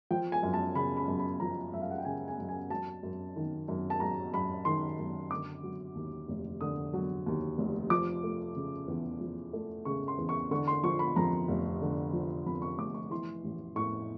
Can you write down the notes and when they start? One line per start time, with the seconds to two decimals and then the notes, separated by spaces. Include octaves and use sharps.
0.11 F3 G5
0.32 G#5
0.43 F#2
0.53 A5
0.75 C#3 B5
0.97 B5
1.08 F#2
1.19 B5
1.40 F3 A#5
1.73 F#2 E5
1.82 F5
1.90 F#5
1.98 G5
2.05 C#3 G#5
2.28 G#5
2.39 F#2
2.49 G#5
2.70 F#3 A5
3.03 F#2
3.36 D#3
3.68 F#2
3.90 A5
4.00 F#3 A#5
4.34 F#2 B5
4.65 D#3 C6
4.99 F#2
5.31 D3 D6
5.63 F#3
5.95 D#2
6.28 F1
6.61 D3 D#6
6.93 F#3
7.26 D#2
7.58 F1
7.90 F3 D6
8.24 A3
8.56 C#3
8.88 E2
9.21 F3
9.53 A3
9.85 C#3 C#6
10.08 C6
10.18 E2
10.29 C#6
10.51 D3 C#6
10.68 C6
10.83 F3 C#6
10.99 B5
11.16 F2 A#5
11.48 F1
11.82 D3
12.13 F3
12.46 F2 B5
12.62 C#6
12.78 F1 D6
12.94 C#6
13.11 E3 C6
13.44 A1
13.76 A2 C#6